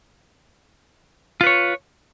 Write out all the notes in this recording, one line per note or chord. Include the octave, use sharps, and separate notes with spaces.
F4 B4 C#5